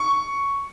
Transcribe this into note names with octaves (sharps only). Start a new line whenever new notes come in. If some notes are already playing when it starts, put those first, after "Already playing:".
Already playing: C#6